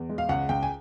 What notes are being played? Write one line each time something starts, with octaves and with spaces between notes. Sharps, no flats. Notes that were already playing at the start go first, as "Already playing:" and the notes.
Already playing: E2
G#3
F5
C#2 F#5
C#2 G5
G#5